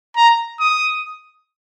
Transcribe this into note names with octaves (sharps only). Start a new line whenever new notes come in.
A#5
D#6